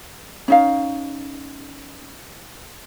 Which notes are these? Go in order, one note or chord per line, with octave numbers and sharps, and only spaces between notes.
C#4 D#4 F5